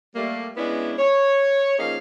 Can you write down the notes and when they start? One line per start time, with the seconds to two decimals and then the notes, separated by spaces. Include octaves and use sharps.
0.16 G3 A3 A#3
0.57 G#3 B3 C#4 D4 E4
0.98 C#5
1.79 F3 A#3 C#4 D#4 G#4 F5